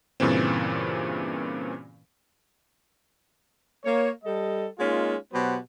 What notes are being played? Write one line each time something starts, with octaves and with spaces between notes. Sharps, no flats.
G2 A#2 C#3 E3 C4
A#3 C#5
G3 A4 D#5
G#3 A#3 C#4 D#4 F4
B2 F#3 B3 G4 C5 F#5